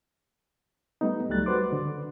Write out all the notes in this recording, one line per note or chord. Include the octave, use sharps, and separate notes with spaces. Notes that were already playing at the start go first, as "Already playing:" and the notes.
G3 A3 B3 D#4
C#2 F#3 G3 A3 F#6 A6
F#4 B4 C5 C6 D6
D3